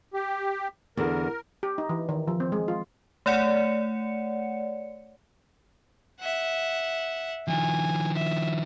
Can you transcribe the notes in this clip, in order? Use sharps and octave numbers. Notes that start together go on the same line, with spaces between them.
G4
E2 D3 A4 A#4
G4
D#4
E3
D#3
F3
C4
G#3
F4
A3 C#5 D5 F#5 C#7
E5 F#5
D#3 F3 G#5
E5